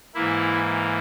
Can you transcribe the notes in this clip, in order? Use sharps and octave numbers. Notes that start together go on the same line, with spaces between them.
G#2 E3 A#3 E4